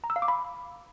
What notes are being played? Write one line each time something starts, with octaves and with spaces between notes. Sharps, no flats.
A#5
E6
F5
D6
B5